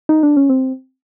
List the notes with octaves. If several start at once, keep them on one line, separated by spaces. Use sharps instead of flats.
D#4
D4
C#4
C4